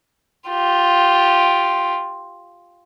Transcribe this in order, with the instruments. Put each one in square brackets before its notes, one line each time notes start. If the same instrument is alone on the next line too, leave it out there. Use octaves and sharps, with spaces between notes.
[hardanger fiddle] F4 G4